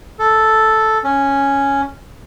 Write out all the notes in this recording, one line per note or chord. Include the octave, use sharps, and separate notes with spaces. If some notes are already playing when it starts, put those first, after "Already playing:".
A4
C#4